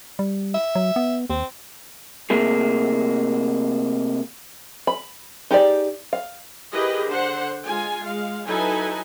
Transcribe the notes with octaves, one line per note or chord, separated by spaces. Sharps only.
G3
E5
F#3
B3
D#2 C4
C3 A3 A#3 G#4
B5
D#4 G4 G#4 D5
F5
E4 G4 G#4 A#4 B4 D#5
D3 C5 F#5
G#3 F4 G#5
G#3 F5
F#3 D#4 E4 A4 B4 G#5